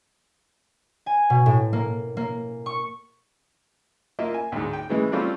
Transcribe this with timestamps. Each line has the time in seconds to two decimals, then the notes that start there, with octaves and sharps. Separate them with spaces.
1.06 G#5
1.30 B2
1.46 A2
1.73 A#3
2.17 A#3
2.66 C#6
4.19 A#3 F4 D#5 E5
4.34 G#5
4.52 D2 G#2
4.73 G5
4.89 C#3 E3 G#3
5.12 G3 A3 C4 C#4 F4 A4